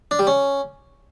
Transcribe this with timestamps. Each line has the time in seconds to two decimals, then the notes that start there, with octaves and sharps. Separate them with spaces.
0.11 D4
0.19 G3
0.27 C#4